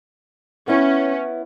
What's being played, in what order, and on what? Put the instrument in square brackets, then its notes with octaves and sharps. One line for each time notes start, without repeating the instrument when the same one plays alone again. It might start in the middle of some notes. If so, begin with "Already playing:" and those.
[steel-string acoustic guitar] B3 E4 [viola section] C#4